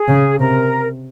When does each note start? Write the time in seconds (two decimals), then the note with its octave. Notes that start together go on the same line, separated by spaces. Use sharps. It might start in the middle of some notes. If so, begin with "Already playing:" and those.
Already playing: G#4
0.08 C#3
0.39 C3 A#4